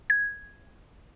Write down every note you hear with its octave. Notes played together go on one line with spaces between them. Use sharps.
G#6